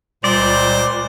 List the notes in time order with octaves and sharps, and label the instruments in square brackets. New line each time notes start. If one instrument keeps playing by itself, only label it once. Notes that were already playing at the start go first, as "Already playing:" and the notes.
[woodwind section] C#2 A#2 G3 [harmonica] C5 [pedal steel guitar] D5